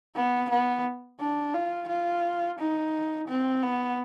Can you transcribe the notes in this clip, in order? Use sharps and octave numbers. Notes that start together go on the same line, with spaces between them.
B3
B3
D4
F4
F4
D#4
C4
B3